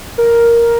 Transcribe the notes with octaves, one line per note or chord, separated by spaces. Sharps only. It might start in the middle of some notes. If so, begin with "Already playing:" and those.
A#4